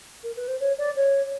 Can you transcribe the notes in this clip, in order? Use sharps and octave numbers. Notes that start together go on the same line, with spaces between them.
A#4
B4
C5
C#5
D5
C#5